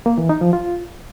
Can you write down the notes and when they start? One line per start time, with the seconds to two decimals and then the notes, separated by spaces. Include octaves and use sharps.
0.06 A#3
0.18 E3
0.29 D#4
0.41 F3
0.53 F4